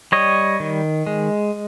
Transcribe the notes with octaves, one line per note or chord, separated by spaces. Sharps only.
G3 C#5 D#5
D#3
G#3